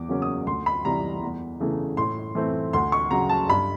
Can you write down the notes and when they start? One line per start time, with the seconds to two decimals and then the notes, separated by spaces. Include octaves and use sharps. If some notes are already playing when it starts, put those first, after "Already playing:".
Already playing: E2 D6
0.09 C#3 F#3 A#3 C#4
0.22 D#6
0.47 D2 C6
0.66 B5
0.85 C3 E3 G3 A#5
1.22 E2
1.60 C#3 E3 A3
1.97 A2 C6
2.35 E3 A3 C4
2.73 D2 C6
2.92 C#6
3.11 C#3 F#3 A#5
3.29 A5
3.49 G2 B5